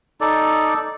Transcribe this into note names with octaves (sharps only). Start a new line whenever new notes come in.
D#4 A4 D5